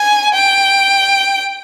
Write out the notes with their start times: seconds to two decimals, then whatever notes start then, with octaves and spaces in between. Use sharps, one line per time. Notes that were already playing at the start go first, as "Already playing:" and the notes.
Already playing: G#5
0.34 G5